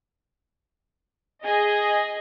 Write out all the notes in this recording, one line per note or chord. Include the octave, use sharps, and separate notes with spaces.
G#4 D#5